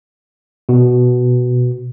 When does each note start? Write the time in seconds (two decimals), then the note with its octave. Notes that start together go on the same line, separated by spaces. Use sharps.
0.69 B2